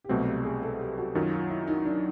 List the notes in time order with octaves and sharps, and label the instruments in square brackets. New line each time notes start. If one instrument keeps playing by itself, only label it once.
[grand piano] G4
[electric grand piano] C2 B2 F#3 A3 C4 [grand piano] F#4
[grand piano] G4
G#4
A4
G4
F#4
[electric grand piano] F#2 D#3 F#3 [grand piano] F4
[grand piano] F4
E4
D#4
D4